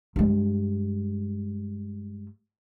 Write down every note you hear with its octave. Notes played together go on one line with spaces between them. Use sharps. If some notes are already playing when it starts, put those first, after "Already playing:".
G2 G#3